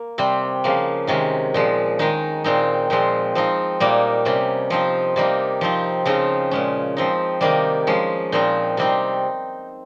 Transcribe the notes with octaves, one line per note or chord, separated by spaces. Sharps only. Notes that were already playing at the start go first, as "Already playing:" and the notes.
Already playing: A#3
C3 G3 C4
C#3 F3 A#3
C3 D#3 G#3 C#4
A#2 F3 G#3
D#3 G#3 D#4
A#2 G#3 C4 D#4
A#2 F3 G#3 C4
F3 C4 D#4
A#2 G3 A#3 D#4
C3 G3 C#4
F3 C4 D#4
C3 G3 A#3 D#4
F3 C4 D#4
C#3 F3 C4 D#4
A#2 G#3 C#4
F3 C4 D#4
C3 D#3 G3 A#3 D#4
F3 G#3 C#4
A#2 F3 C4 D#4
C3 G3 C4 D#4